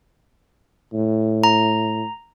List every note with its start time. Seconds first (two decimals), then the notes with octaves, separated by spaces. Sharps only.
0.94 A2
1.44 A#5